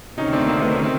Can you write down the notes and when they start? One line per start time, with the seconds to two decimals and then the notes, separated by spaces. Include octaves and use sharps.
0.18 D2 C3 D#3 C#4 D#4
0.33 C4 D4
0.46 A#3 C4
0.61 A3 B3
0.76 C#4
0.83 C4